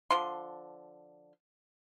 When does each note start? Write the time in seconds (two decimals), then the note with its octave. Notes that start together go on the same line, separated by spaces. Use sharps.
0.11 D3 F3 C6